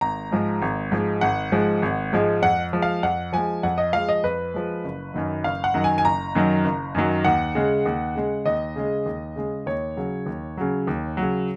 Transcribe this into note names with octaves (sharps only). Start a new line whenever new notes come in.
G#1 A#5
G#2 F3 G#3
G#1
G#2 F3 G#3
G#1 F#5
G#2 F3 G#3
G#1
G#2 F3 G#3
F2 F#5
F3 G#3
F5
F2 F#5
F3 G#3 G#5
F2 F#5
D#5
F3 G#3 F5
D#5
F2 B4
F3 G#3
F#1
F#2 D#3 F#3
F#1 F5
F#5
F#2 D#3 F#3
G#5
G#5
F#1 A#5
F#2 D#3 F#3
F#1
F#2 D#3 F#3
D#2 F#5
C#3 G#3
D#2
C#3 G#3
D#2 D#5
C#3 G#3
D#2
C#3 G#3
D#2 C#5
C#3 F#3
D#2
C#3 F#3
D#2
C#3 F#3